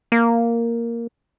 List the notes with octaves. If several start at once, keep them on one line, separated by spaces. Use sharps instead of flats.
A#3